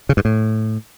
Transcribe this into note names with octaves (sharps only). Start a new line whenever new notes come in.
C#3
G2
A2